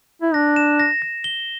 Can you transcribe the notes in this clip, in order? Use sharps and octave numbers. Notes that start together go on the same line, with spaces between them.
E4
D4 A#6
E7
A#6
A#6
G7